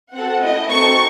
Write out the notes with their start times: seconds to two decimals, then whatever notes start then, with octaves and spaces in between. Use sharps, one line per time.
0.13 C4 F#4 A4 F#5
0.43 A3 C#4 E4 D#5
0.70 C4 D#4 F#4 A4 C#6